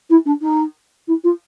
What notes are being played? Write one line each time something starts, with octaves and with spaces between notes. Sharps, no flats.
E4
D4
D#4
E4
F4